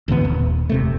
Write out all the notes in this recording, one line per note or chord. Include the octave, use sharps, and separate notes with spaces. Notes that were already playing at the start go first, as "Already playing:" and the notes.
A1 D2 A2 B3
D#1
F1 C3 A3